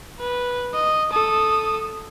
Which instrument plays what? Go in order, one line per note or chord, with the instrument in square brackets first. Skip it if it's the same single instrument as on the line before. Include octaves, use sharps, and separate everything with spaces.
[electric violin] B4
D#5
A4 D#6